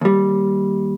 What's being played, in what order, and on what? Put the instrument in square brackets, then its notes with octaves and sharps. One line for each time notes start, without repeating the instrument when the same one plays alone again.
[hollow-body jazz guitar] D#2 G3